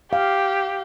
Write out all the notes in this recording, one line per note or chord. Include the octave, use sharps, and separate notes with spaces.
G4 F5